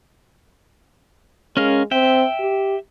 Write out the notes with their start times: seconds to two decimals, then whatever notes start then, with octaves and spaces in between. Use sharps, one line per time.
1.57 G#3 C#4 A#4 F5
1.91 C4 E5 G5
2.40 G4